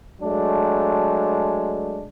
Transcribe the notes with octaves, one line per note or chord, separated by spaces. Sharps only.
F#3 G#3 A3 D4